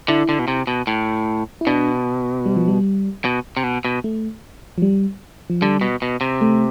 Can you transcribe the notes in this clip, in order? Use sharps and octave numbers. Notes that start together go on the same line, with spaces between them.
D3 E4
D3
B2
C3
B2
A2
E4
B2 D4
G3
F3
G3
B2
C3
B2
B2
A3
F3
G3
F3
D3 G3
B2
B2
C3
A3